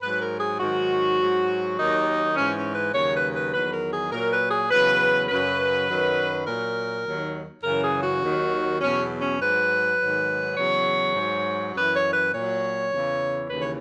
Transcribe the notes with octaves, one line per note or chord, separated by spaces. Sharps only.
G#2 F#3 B4
A#4
G#4
G#2 D#3 F#3 F#4
G#2 F#3
D#2 D#3 F#3 D#4
G#2 E3 C#4
C#4
B4
D#2 C#3 F#3 C#5
B4
B4
E2 D#3 F#3 B4
A#4
G#4
A#2 F#3 A#4
B4
G#4
E2 C#3 F#3 B4
F#2 C#3 F#3 B4
F#2 D#3 F#3
A#2 F#3 A#4
D#2 D#3 F#3
F#2 C#3 E3 A#4
G#4
F#4
D#2 D#3 F#3
E2 B2 F#3 C#4
C#4
G#2 F#3 B4
G#2 D#3 F#3
E2 C#3 F#3 C#5
G#2 F#3
F#2 E3 B4
C#5
B4
A#2 F#3 C#5
E2 C#3 E3
D#2 C#3 E3 B4
C#5